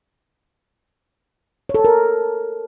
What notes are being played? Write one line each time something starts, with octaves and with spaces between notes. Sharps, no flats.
C#5
A4
C#5
A#4